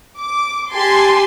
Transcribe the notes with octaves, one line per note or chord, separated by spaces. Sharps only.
D6
G4 G#5 A5 C6